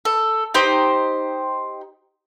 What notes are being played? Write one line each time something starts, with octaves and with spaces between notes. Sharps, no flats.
A4
D#4 G4 C5